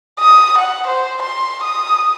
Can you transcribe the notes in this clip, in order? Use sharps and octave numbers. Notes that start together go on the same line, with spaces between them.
D#6
F#5
C5
C6
D#6